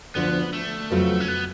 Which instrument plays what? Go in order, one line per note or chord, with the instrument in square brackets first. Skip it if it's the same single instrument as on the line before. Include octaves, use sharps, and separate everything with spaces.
[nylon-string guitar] D2 D3 F3 [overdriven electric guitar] B3
[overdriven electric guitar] A3
[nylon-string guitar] F2 C#3 F#3 B3 F4
[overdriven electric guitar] C#4
B3